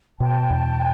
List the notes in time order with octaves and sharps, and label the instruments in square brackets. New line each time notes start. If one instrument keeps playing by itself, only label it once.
[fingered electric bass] B2 [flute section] G5 A5
[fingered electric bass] E2